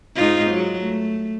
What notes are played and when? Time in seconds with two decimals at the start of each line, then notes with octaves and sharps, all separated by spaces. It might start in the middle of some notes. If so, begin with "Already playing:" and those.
0.15 G#2 D#4 F4
0.51 F#3 G#3
0.81 A3